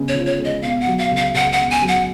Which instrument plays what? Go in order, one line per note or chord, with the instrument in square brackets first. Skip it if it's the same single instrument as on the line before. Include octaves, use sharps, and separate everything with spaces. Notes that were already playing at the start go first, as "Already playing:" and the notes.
Already playing: [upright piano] C#3 G#3 B3
[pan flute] C#5
[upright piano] F3
[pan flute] C#5
[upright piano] G#3
[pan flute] D#5
[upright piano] B2 [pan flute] F5
[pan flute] F#5
[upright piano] F#3
[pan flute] F5
[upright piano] C#2
[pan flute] F5
[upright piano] C#2 [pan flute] F#5
[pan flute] F#5
[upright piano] B2
[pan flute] G#5
[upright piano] F#3
[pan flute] F#5